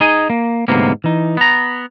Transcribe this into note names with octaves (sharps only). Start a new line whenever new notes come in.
D#4 G#4 D#5 G#5
A#3
D2 G#2 C3 F#3 A#3 B3
E3 D#4
B3 A#5